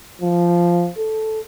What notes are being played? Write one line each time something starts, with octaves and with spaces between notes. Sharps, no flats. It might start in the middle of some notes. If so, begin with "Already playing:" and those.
F3
A4